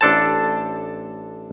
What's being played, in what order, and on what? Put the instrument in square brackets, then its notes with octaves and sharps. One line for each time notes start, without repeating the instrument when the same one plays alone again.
[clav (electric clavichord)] A1 D4 A4 C5 A5